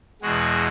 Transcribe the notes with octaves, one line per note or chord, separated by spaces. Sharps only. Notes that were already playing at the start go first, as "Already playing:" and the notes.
E2 B2 G#3 F#4